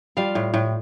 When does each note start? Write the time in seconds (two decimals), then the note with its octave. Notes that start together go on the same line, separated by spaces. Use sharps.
0.17 G3 F4 F5
0.35 A2
0.54 A2